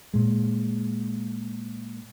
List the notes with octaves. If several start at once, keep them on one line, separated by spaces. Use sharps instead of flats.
A#2 G#3